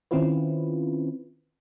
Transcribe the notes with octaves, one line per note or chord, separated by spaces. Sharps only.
D#3 C4 C#4 E4 F4 B4